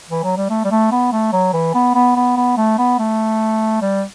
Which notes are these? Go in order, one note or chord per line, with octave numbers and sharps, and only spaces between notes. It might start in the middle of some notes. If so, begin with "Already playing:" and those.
E3
F#3
G3
A3
G3
A3
B3
A3
F#3
E3
B3
B3
B3
B3
A3
B3
A3
G3